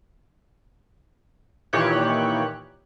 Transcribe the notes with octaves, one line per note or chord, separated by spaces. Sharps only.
A#2 D#3 E3 G4 C#5 F#6